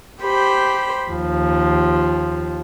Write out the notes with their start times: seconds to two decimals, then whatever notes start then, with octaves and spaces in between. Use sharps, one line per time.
0.22 G4 C5 B5
1.10 D#2 F3